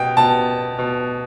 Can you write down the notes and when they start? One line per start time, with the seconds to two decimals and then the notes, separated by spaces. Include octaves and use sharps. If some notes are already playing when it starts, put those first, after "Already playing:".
Already playing: B2 G5
0.17 B2 A5
0.79 B2